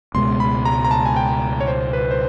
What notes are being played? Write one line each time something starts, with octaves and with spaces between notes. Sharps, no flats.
C#2 B2 G#3 C6
B5
A#5
A#5
A5
G#5
G5
C#5
C5
B4
C5